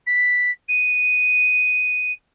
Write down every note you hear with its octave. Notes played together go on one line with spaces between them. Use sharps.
B6
D#7